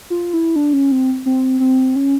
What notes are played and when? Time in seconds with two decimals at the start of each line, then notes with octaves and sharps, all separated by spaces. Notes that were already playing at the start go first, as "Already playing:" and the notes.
0.10 F4
0.33 E4
0.56 D4
0.73 C#4
0.92 C4
1.26 C4
1.60 C4
1.96 C#4